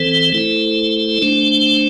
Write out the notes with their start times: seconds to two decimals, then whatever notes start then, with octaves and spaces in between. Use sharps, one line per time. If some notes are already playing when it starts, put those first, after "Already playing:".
Already playing: E3 C4 A4 C5
0.32 A3 E4 A4 C5
1.22 A3 D4 C5